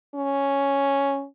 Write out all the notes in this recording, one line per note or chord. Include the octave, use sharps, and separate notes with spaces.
C#4